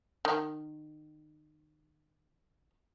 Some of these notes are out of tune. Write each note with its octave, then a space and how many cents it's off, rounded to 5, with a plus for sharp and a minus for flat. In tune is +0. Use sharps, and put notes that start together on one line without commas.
D#3 -30